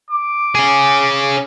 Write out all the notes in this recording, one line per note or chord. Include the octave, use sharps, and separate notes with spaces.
D6
C#4 G#4